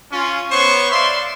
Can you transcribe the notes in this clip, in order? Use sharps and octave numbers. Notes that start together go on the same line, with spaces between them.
C#4 F4
B3 C5 C#5 C#6
D5 E5 F5 C6